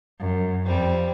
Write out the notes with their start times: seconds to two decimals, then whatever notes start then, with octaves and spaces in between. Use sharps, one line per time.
0.19 F#2
0.66 F2 G3 C4